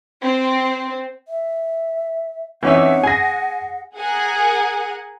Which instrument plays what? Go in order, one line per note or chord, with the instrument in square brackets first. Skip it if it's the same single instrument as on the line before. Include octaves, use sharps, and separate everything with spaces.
[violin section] C4
[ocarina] E5
[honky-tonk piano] E3 E5 [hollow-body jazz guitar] C4 C#4 D#4 [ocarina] F#5
[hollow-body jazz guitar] G#4 [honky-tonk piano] G#5 A#6
[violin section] G#4 A#4 F#5 G#5